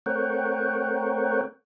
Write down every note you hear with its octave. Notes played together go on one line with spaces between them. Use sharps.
A3 C4 A#4 C#5 F#5 G5